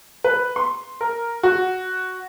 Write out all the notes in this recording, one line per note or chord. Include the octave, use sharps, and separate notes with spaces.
B4
C6
A#4
F#4